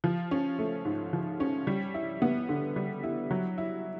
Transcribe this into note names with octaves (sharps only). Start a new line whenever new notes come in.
F3
C#4
A3
G#2
F3
C#4
G3
E4
B3
D3
G3
E4
F#3
E4